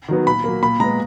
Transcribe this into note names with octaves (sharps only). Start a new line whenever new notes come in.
D#3 F#3 B3
A#2 B5
F#3 A#3
A#2 B5
G#3 B3 A#5